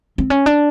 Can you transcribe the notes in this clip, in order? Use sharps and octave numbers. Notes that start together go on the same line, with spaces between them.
C4
C#4
D4